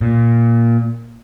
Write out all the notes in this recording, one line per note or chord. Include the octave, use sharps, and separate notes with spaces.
A#2